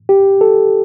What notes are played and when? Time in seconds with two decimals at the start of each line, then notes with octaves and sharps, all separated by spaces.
0.09 G4
0.41 A4